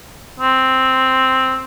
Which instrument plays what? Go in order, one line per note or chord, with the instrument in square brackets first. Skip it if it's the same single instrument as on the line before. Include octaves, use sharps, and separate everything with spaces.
[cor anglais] C4